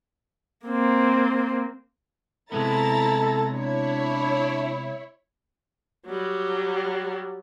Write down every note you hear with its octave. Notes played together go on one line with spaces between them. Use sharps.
A#3 C4
C3 G#3 B3 E4 A4 A#5 A6
D4 E4 C#5
F#3 G3